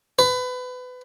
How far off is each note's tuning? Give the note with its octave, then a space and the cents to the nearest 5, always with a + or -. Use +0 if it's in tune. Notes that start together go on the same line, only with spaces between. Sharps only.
B4 +25